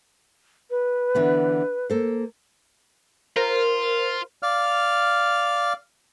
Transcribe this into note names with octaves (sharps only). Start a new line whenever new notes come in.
B4
D3 E3 B3
A#3 A4 C5
F4 A#4 C5
D5 F5 F6